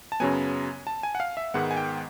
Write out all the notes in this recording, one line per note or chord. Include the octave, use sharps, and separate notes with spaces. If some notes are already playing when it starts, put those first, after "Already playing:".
A5
F#2 C#3 F#3 B3 G#5
A5
G#5
F#5
F5
E5
G#2 D#3 G#3 B3 F#5
G#5
G5